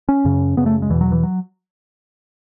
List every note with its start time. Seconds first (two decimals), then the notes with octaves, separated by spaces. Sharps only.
0.09 C#4
0.25 F#2 C#3
0.57 F#2 C#3 B3
0.66 A3
0.82 G#3
0.90 E2 B2 E3
1.01 F#3
1.12 E3
1.23 F#3